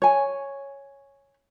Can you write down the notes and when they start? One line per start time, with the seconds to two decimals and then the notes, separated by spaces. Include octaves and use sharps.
0.02 C#5 G#5